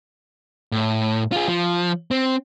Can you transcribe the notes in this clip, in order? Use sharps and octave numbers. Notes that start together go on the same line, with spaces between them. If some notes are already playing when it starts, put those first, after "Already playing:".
A2
F4 G#4
F3
C4